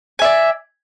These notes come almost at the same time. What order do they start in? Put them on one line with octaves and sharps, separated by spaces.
G#5 E5 D5